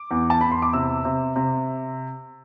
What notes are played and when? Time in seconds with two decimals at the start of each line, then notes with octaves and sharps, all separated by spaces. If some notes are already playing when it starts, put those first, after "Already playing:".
Already playing: D6
0.11 E2
0.30 A5
0.41 E2 B5
0.51 C6
0.62 D6
0.73 C3 E6
1.05 C3
1.36 C3